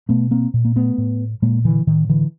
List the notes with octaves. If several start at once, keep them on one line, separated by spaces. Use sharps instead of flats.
B2 A3 B3
A#3 C4
A#2
A#3
A3 B3
A2
A#2 G#3 A#3
D3 E3
A2 D#3
D3 E3